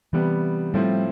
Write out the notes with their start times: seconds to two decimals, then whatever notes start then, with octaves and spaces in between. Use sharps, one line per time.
0.13 C3 E3 G3 B3
0.74 A2 F3 G3 C4 E4